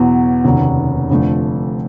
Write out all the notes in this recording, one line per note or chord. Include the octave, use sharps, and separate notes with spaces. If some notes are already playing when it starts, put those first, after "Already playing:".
Already playing: E2 B2 F#3
F1 D#2 C#3 F#3
F1 F2 D3 F3 A3